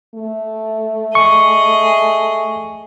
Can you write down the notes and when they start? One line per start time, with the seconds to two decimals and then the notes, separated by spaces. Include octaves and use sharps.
0.14 A3
1.15 G#4 D#5 C#6